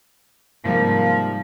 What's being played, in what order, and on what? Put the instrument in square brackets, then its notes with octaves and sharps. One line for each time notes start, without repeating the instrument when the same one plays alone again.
[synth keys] G#2 C3 G3 [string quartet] F3 [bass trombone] A#3